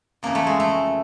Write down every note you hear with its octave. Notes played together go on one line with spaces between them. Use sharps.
F2 C#3 E3 A#3
A3
G#3
A3